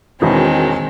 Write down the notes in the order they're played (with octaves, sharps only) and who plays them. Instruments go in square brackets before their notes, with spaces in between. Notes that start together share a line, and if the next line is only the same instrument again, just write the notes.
[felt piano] E1 B2 E4 [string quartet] D#3 G#3 C4